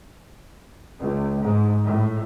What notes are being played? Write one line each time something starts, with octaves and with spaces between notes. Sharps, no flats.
C#2
G#2
A2